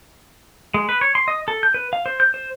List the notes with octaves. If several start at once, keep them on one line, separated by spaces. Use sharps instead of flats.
G#3
B4
C#5
C6
D#5
A4
G6
B4
F5
C5
G6
C5